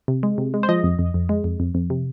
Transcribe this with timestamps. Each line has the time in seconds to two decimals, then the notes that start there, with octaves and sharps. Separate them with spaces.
0.08 C3
0.23 G#3
0.38 C3
0.54 G#3
0.63 C5
0.69 F3 D#5
0.84 F2
0.99 F2
1.14 F2
1.29 G#3
1.44 F2
1.60 F2
1.75 F2
1.90 C3